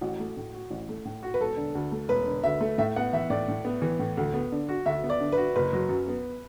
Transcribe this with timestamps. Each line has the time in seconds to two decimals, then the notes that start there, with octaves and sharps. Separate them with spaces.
0.01 A1 F#4
0.20 A3
0.37 A2
0.54 F#4
0.70 A1
0.89 A3
1.05 A2
1.23 F#4
1.34 B4
1.40 E1 A4
1.57 D3
1.75 D2
1.92 A3
2.09 E1 B4
2.26 D3
2.43 D2 E5
2.61 A3
2.78 A2 E5
2.96 B3 F#5
3.13 E3 E5
3.30 A2 D5
3.48 A2
3.65 B3
3.82 E3
3.99 A2
4.17 D2
4.34 B3
4.52 D3
4.69 F#4
4.86 D2 E5
5.04 B3
5.10 D5
5.20 D3
5.32 B4
5.37 F#4
5.56 F#1 B4
5.73 F#3
5.89 F#2
6.08 B3